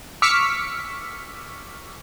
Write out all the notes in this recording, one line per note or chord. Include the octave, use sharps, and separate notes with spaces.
C#6 D6 E6 F6 B6 C#7